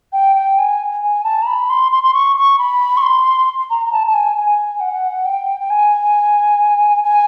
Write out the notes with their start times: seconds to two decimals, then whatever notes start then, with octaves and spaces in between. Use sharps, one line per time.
0.13 G5
0.36 G5
0.58 G#5
1.03 G#5
1.24 A5
1.42 A#5
1.47 B5
1.70 C6
1.92 C6
2.03 C6
2.14 C#6
2.36 C#6
2.59 B5
2.97 C#6
3.02 C6
3.70 A#5
3.86 A#5
3.92 A5
4.07 A5
4.14 G#5
4.37 G#5
4.80 F#5
5.25 G5
5.60 G5
5.70 G#5
7.04 G#5